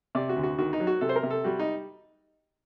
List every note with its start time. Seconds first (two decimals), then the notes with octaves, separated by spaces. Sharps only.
0.15 C3 D5
0.29 F#4
0.36 D2
0.43 F#4
0.58 D#3 F#4
0.73 D#4
0.80 F#3
0.87 F#4
1.01 C3 A4
1.09 C5
1.16 A#4
1.23 C3
1.30 A4
1.44 G3 F#4
1.59 D#4